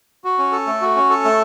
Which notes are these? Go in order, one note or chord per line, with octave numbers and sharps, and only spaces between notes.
F#4
C#4
A4
A3
F#4
C#4
A4
A3